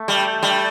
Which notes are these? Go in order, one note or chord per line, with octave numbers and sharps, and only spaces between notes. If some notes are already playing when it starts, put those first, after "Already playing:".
Already playing: A3
G3
G3